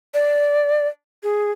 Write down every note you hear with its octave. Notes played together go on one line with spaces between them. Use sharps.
D5
G#4